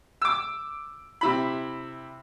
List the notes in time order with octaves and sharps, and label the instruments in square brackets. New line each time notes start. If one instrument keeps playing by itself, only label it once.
[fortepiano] D6 E6
C3 E4 B5